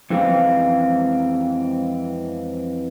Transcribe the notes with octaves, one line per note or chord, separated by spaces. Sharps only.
F2 E3 G#3 C4 F5